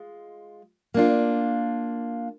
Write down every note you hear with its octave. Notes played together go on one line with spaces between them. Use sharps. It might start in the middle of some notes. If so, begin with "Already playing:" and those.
Already playing: G#3 F4
A#3 D4 F4